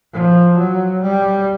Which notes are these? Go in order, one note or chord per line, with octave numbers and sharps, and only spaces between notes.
F3
F#3
G3